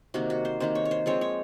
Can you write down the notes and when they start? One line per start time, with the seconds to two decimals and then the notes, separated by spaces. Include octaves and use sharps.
0.14 C3 D#3 A#3 F#4
0.30 F#4
0.45 C5
0.60 C3 D#3 A#3 C5
0.75 C#5
0.85 C#5
0.91 C5
1.06 F3 G#3 C4 C#5
1.21 C#5